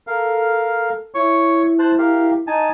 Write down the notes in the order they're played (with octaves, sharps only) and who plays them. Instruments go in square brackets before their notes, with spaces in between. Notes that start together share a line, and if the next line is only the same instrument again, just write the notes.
[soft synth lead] A4 [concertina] A#4 F5
[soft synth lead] E4 [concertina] C#5 C#6
[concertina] C5 A5 F#6
G4 A#4 F5
D#4 G#5 A5